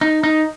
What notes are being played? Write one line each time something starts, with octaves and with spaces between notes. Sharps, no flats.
D#4
D#4